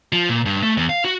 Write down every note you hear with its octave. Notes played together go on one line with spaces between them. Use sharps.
F3
A#2
G2
A3
E2
F5
F#4